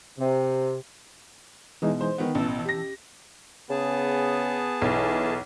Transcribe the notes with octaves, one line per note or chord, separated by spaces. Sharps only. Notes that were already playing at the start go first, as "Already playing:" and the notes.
C3
B2 E3 G#3 D#4
C5
D#3 B3
A1 B2 E3 A5 E6
G4 A#6
C#3 B3 G#4 A5
B1 E3